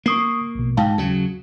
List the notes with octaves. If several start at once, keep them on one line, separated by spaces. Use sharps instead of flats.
A#3 C#6 D#6 C7
A#1 B2
G#2 F5 G5 A5
D#2 C#3 F#3